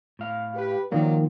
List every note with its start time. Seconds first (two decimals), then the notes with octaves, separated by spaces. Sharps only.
0.19 A2 F5
0.55 G4 B4
0.92 D#3 F3 F#3 A#3 D#4 D5